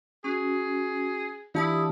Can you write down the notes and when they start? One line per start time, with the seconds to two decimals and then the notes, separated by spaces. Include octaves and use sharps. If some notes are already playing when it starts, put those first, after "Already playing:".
0.24 C#4 F#4 G#4
1.55 E3 D4 E4 F4 G4 A5 D#6